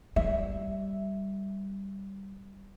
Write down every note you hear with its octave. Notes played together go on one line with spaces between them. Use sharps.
G3 E5